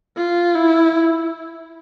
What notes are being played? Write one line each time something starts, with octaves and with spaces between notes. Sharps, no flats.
F4
E4